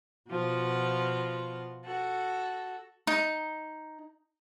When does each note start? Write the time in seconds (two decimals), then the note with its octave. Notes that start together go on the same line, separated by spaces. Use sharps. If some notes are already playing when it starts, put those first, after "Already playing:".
0.30 B2 F3 F4 F#4
1.85 F#4 A4
3.07 D#4